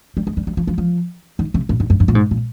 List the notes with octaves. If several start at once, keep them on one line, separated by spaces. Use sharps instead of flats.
G3
G#3
G3
G3
F3
F3
F3
D#3
C3
A#2
G#2
G2
G2
A#2
G#2
A#2